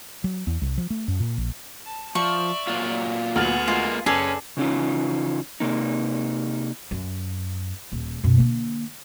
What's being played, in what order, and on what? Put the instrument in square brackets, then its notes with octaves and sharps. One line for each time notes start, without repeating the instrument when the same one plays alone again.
[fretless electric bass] F#3
E2
C2
F3
A3
F#2
A#2
A#1
[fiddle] A5
[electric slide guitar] F3 [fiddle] D5 E5 [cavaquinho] C#6
[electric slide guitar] A#2 F#3 F4
[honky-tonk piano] D2 F6 A6 [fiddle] B3 G#4
[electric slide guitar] G#3 A#3 [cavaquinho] F4
[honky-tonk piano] F#1 [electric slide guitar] C#4 [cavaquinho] G#4 A4 D5 [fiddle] B4
[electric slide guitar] C#3 E3 C#4 D#4 F4
C3 A#3 D#4
[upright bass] F#2
D#1
F#2 B2
D3 A#3